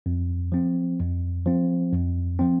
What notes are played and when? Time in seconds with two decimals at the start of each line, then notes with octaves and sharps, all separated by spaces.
0.06 F2
0.52 F3 C4
1.00 F2
1.46 F3 C4
1.93 F2
2.39 F3 C4